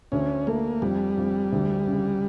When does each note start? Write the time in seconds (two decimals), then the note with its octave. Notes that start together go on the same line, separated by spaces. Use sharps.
0.12 D2 C#4
0.47 A3 A#3
0.82 F2 G3
1.17 F2
1.52 D2
1.87 C#3